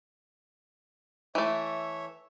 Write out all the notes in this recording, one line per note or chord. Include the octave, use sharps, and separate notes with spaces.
E3 A3 C#5 E5